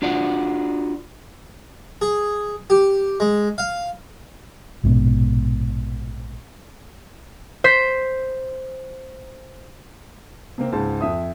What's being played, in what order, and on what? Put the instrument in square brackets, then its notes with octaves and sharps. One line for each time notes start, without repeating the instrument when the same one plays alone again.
[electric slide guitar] D4 F4 F#4 D5
[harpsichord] G#4
G4
G#3
F5
[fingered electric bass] A#1 G#2 B2
[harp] C5 G6 B6
[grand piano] C3 A#3 C4
C#2 G#2 A5
F2 E5 D#6